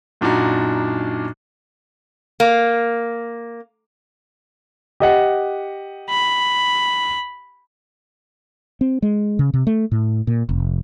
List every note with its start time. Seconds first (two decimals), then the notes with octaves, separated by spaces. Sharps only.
0.21 F#2 A#2 D4 D#4 F#4
2.40 A#3
5.00 G4 D#5 F#5
6.10 B5
8.81 C4
9.02 G#3
9.39 C#3
9.54 C3
9.67 A3
9.92 A2
10.27 A#2
10.49 F1